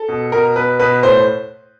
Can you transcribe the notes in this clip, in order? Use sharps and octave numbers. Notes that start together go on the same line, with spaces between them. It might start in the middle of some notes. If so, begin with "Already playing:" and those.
Already playing: A4
B2
B2 A#4
B2 B4
B2 B4
A2 C5